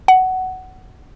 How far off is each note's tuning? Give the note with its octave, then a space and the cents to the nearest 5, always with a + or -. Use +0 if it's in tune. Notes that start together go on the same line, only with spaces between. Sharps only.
F#5 +15